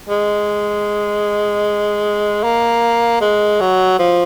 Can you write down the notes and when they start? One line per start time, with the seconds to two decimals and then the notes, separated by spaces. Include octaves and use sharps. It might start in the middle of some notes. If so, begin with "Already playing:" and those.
0.09 G#3
2.43 A#3
3.21 G#3
3.60 F#3
3.99 F3